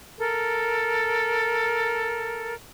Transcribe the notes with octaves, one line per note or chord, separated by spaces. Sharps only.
A4 A#4